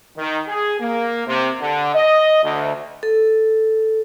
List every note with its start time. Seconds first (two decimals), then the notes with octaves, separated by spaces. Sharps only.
0.17 D#3
0.47 G#4
0.80 A#3
1.27 C3
1.59 D3
1.94 D#5
2.43 D2
3.03 A4